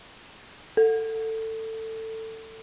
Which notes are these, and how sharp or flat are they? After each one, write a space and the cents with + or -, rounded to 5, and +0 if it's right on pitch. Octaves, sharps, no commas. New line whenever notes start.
A4 +20